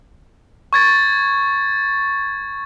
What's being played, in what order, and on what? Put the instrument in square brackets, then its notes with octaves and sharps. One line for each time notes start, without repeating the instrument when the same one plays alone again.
[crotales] C#6 G#6 A6